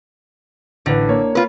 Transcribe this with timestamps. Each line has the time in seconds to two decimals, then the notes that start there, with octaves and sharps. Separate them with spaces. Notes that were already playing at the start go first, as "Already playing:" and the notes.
0.86 A1 D3 B4
1.08 A#3 C#5
1.35 F4 B4